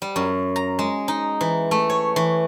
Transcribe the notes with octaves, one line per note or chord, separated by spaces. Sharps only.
G3
F#2
A#5
G#3
D#4
E3
A3
C#5
E3